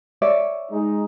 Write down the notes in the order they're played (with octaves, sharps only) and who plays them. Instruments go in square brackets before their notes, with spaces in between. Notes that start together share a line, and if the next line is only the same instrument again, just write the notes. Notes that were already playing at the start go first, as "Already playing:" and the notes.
[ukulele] C#5 D5 E5
[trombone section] G#3 D#4